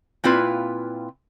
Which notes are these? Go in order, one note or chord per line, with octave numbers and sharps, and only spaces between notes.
A#2 C4 E4 F4 B4